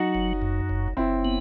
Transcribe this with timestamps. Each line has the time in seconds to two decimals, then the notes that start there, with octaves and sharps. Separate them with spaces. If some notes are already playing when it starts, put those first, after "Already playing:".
Already playing: F#3 D#4 F#4
0.15 F#1
0.42 F#2
0.69 F#1
0.97 F#1 C4 E4
1.25 B3